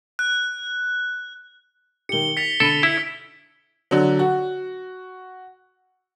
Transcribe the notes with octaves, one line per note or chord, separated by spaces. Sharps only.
F#6
D#3 G4 C#7 G7
A6 B6 C#7 F7
D3 A4 B5 D7 D#7
E4 E6 F#7
D3 F#3
F#4